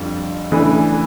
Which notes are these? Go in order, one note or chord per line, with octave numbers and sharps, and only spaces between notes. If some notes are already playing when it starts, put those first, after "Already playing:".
Already playing: F2 D3 G3 C4 F4
C#3 E3 A3 D4